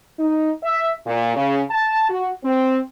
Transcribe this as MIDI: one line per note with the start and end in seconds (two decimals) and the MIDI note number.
0.19 0.50 63
0.63 0.92 76
1.05 1.33 46
1.36 1.60 49
1.69 2.08 81
2.09 2.29 66
2.43 2.78 60